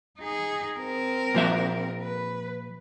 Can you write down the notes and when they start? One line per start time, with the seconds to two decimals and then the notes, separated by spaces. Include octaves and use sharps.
0.19 D#4 G#4
0.77 C4 A#4
1.34 A#2 F3 E5
2.02 B4